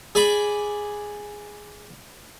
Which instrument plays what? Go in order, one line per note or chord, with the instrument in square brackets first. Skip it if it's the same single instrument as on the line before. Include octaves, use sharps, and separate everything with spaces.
[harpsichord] G#4 D5 G#5 B5 D6